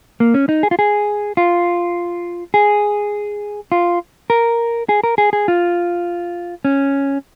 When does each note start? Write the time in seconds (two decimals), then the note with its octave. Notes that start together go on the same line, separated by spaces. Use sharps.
0.20 A#3
0.34 C#4
0.49 D#4
0.63 G#4
0.71 F4
0.79 G#4
1.37 F4
2.54 G#4
3.72 F4
4.30 A#4
4.89 G#4
5.04 A#4
5.18 G#4
5.33 G#4
5.48 F4
6.65 C#4